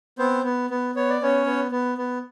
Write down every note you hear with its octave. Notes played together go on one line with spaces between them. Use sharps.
B3 C4 C5
B3
B3
B3 C#5
D5
B3 C#4 C#5
B3
B3
B3